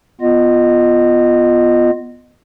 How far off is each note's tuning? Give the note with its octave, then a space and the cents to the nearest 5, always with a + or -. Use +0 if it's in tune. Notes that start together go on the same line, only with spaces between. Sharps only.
B3 +5 F4 +0 D#5 -20